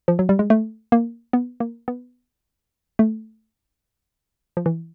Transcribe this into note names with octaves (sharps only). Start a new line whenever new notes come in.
F3
F#3
G3
G#3
A3
A#3
B3
A#3
B3
A3
F3
E3